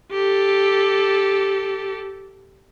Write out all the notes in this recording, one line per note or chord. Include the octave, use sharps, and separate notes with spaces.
G4 A4